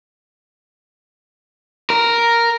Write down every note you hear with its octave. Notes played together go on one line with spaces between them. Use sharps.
A#4